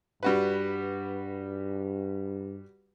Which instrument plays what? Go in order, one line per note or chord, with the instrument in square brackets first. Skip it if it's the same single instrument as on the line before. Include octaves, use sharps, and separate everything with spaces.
[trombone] G2 [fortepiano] G3 F#4 B4